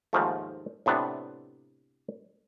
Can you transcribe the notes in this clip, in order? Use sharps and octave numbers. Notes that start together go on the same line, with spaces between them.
D#2 G#2 F3 A3
A2 C3 B3 D4